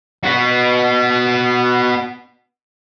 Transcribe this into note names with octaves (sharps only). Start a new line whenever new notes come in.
B3 F#4